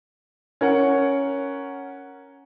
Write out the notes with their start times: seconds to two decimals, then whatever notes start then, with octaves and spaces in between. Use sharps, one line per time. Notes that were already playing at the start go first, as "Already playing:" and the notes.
0.61 C#4 A#4 F#5